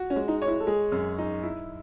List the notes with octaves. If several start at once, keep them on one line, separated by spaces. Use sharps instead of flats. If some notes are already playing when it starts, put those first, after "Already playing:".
Already playing: F#4
C#4
G#3
D#4
C#5
E4
A4
G#3 G#4
F#2
D#4
E4